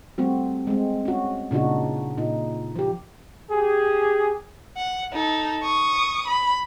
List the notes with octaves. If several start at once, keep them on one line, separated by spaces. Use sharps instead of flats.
G3 A3 C4 F#4
G#3 C4
C#4 F#4
A#2 C#3 D4 D#4 F#4
A#2 D#4
F3 G4
G4 G#4
F#5
D#4 A4
C#6 D#6
B5